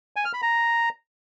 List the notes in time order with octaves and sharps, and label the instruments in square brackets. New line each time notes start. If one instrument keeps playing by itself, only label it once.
[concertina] G#5
F6
B5
A#5